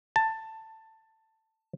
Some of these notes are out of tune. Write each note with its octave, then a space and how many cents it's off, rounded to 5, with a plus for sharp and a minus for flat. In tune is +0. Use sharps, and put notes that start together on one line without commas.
A5 +15